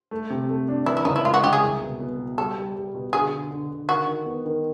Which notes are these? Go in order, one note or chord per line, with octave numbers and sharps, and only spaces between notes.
A3
C3
A3
D4
E3 E4
E4
C#3 D#4
E4
G#3 F4
F#4
C#3 G4
G#4
C2
B2
B3
B2
G3 A4
G3
G3
B2
D3 G#4
D3
D3
D3
D#3 F#4
D#3
B3
D#3